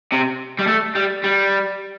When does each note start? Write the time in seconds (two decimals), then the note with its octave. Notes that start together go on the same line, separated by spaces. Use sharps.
0.12 C3
0.59 G3
0.67 A3
0.95 G3
1.24 G3